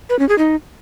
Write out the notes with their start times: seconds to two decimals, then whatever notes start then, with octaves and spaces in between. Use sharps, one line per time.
0.09 B4
0.19 C#4
0.29 G#4
0.38 D#4